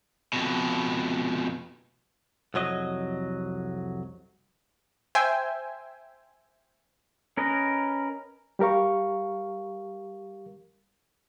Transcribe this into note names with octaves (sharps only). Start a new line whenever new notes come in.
F2 B2
C2 F2 F#3 D#5
C5 E5 G5 G#5
C#4 A#4 B4 D#5
G3 G4 A#4 F5 C#6